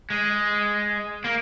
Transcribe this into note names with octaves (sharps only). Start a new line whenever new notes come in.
G#3
A#3